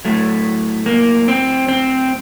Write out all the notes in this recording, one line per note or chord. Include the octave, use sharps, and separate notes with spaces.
A2 F#3 A3
A#3
C4
C4